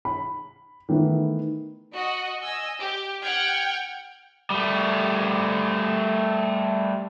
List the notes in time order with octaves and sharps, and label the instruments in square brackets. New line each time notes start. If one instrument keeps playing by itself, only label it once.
[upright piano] B5
D#3 E3 A3 B3 E4
[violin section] F#4 D#5
D#5 G#5 E6
G4
F#5 G5 F6 G#6
[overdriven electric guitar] G3 A3